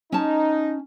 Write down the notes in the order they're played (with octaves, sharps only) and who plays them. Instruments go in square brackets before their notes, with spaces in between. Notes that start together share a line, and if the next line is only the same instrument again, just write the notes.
[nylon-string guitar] C#4 A5 [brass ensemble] D#4